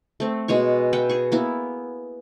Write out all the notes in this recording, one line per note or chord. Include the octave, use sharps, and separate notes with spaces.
A3 C4
B2 G#3 C#5 C#6
B4 E5 F#5 G5
G#4 C#6
A#3 B3 E4